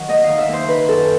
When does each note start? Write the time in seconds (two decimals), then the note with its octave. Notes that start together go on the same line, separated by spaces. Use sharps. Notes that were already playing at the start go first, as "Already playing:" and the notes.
Already playing: D#3 F#3
0.08 D#2 D#5
0.24 D#3 F5
0.39 E5
0.49 D#2 C5
0.68 D#3 B4
0.88 F#2 A4